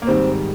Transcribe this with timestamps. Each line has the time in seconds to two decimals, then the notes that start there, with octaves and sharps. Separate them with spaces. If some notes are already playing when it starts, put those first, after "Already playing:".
0.02 A#3
0.07 G#2 D#3 G3 C4